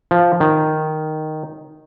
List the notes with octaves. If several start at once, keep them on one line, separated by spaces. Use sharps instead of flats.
F3
D#3